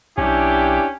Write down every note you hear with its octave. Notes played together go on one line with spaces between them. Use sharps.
B1 C#4 D4 E4 G4